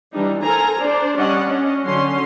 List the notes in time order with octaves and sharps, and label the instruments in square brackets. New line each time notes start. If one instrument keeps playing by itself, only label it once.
[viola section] E3 G3 D4 D#4
A4 A#4 C5 G#5 A#5
D4 C5 D5
G3 C#4 D4 D5 D#5 F#5
C#4 D4 D#5
D3 F#3 C#4 F#4 C6